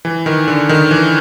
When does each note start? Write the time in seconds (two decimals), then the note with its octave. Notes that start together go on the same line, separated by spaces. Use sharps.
0.05 E3
0.26 D#3
0.48 D3
0.69 D#3
0.91 E3